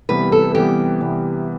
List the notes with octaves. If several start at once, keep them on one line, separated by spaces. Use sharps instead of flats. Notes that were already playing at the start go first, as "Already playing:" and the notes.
C3 E3 G3 B3 B4
A4
C3 E3 G3 B3 G4
C3 E3 G3 B3